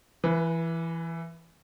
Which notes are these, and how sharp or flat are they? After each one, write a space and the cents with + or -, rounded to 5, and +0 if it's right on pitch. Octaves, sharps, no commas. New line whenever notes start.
E3 +15 B4 -20